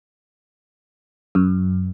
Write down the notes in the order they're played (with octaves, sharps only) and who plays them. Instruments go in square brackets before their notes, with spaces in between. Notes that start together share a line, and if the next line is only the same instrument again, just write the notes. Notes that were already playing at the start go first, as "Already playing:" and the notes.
[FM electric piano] F#2